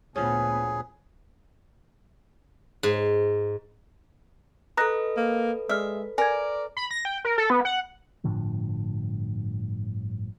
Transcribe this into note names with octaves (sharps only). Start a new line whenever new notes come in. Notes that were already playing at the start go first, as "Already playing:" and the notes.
D2 A#2 F3 B3 C#4 G#4
G#2
A4 B4 D#5 A#5 F#6 A#6
A#3
G#3 D5 E5 F6
A#4 D5 G#5 G#6
B5
A#6
G5
A#4
A4
B3
F#5
G1 A2 D3 F3